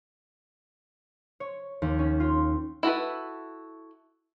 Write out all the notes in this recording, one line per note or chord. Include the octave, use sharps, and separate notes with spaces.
C#5
D#2
C#4
F4
E4 F#4 A4 B4